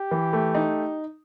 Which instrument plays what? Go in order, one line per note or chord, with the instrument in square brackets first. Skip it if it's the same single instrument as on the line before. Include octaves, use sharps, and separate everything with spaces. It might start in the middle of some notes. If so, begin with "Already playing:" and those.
Already playing: [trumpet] G4
[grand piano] E3
A3
D#4